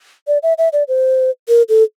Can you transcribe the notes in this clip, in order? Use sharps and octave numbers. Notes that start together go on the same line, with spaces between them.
D5
E5
E5
D5
C5
A#4
A4